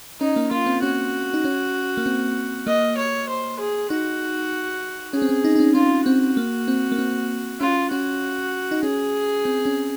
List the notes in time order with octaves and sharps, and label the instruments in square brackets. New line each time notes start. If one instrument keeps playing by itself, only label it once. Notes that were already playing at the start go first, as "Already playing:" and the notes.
[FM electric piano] C#4 [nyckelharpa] D#4
[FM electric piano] A#3
[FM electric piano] A#3 [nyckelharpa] F4
[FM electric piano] C4
[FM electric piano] C#4 [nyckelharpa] F#4
[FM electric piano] D#4
C#4
A#3
C4
[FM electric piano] A#3 [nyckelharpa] D#5
[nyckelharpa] C#5
C5
G#4
[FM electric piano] D#4 [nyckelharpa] F#4
[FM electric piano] C#4 [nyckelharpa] G#4
[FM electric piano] C4
C#4
D#4
D#4
C#4
[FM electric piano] C#4 [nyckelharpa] F4
[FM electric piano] C4 [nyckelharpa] F#4
[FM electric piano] A#3
C4
A#3
C4
[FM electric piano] C#4 [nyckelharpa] F4
[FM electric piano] C#4 [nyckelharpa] F#4
[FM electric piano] D#4
[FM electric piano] C#4 [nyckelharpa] G#4
[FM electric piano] C4
C#4